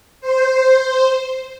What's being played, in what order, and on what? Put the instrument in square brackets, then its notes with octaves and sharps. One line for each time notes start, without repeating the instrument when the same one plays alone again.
[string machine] C5